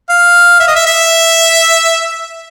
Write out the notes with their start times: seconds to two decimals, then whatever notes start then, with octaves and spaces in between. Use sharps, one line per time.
0.09 F5
0.60 E5
0.68 D#5
0.75 E5
0.86 E5